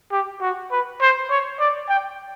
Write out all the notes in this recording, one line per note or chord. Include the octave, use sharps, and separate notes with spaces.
G4
F#4
B4
C5
C#5
D5
G5